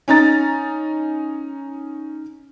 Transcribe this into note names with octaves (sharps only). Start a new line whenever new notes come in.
C#4 D#4 A#5 A6